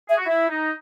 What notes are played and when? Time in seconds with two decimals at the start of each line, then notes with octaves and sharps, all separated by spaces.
0.09 G#4 E5
0.17 F#4
0.26 E4 E5
0.49 D#4